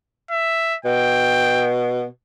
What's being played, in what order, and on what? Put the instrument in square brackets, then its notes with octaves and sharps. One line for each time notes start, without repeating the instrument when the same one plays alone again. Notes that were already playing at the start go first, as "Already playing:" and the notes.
[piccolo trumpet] E5
[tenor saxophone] B2 [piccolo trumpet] G5